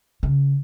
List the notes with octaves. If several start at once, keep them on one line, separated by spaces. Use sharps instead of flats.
C#3